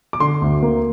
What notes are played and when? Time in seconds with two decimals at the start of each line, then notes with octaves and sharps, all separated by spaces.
0.13 D6
0.20 D3 C6
0.41 D2
0.62 A#3